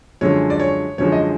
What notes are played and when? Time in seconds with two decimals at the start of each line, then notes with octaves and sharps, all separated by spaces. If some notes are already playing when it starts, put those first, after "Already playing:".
0.21 F#2 D3 F3 G#3 C#5
0.50 D5
0.60 C#5
0.98 F#2 D3 F3 G#3 C#5
1.12 D#5